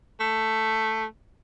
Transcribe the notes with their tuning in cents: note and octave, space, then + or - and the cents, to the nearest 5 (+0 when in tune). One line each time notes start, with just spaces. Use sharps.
A3 +5